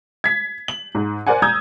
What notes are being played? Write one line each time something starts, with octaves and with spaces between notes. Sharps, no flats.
G#6 B6
F#7
G#2
A#4 C5 D5 F#5 G#5
A#5 D#6 E6 G6 G#6